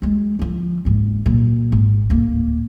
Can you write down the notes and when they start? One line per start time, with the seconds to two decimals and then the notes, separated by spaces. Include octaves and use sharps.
0.02 F#3 G#3
0.39 D3 F3
0.85 F#1 G#2
1.26 A#2 F#3
1.72 G#1
2.10 D1 A#3